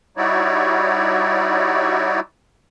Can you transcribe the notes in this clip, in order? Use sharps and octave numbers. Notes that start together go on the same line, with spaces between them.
G3 D#4 E4 F#4 C#5 D5